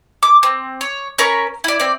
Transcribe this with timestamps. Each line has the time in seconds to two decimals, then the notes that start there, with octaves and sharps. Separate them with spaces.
0.23 D6
0.43 C4
0.81 C#5
1.18 C#4 A#4 B5 C#6
1.64 E4 D5
1.80 C4 D5